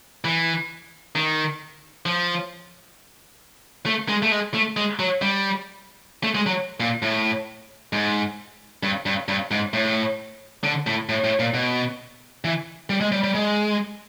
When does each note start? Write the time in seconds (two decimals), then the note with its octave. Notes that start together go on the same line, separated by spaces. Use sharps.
0.25 E3
1.15 D#3
2.06 F3
3.86 A3
4.09 G#3
4.22 A3
4.32 G#3
4.54 A3
4.77 G#3
4.99 F#3
5.22 G3
6.23 A3
6.35 G#3
6.46 F#3
6.80 A#2
7.02 A2
7.93 G#2
8.83 G2
9.06 G2
9.28 G2
9.51 G#2
9.74 A2
10.64 D3
10.87 A2
11.09 A2
11.24 A2
11.40 A#2
11.54 B2
12.45 E3
12.90 G3
13.01 G#3
13.12 G3
13.24 G3
13.35 G#3